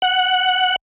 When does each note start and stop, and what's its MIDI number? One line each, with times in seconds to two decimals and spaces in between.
0.02 0.76 78